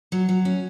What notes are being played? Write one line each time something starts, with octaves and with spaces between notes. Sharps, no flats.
F#3
F#3
C#4